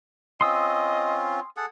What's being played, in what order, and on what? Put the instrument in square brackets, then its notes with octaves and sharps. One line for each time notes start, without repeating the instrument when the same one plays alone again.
[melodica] C4 C#4 F4 [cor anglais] D#5 [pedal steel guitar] C6 D#6 E6
[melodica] G#4 A4 F#5